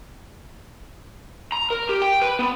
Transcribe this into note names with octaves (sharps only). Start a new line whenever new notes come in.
A#5
A#4
G4
G5
B4
B3